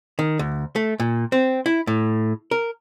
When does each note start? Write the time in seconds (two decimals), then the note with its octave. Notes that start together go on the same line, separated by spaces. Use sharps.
0.19 D#3
0.39 D2
0.76 A3
1.00 A#2
1.32 C4
1.66 E4
1.87 A2
2.51 A#4